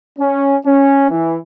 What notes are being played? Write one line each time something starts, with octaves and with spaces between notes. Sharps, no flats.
C#4
C#4
E3